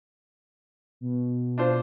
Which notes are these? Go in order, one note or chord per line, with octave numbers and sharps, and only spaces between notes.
B2
D4 F4 C5